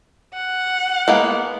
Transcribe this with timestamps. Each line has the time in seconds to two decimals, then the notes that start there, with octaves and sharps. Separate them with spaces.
0.34 F#5
1.08 G#3 A#3 B3